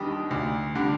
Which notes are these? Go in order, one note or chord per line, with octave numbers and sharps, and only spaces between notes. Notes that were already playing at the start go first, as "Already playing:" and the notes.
Already playing: D#2 D#3 G3 D4 D#5
D2
D3 G3 D4